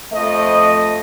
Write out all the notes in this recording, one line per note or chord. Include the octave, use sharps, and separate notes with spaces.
F2 A3 D#5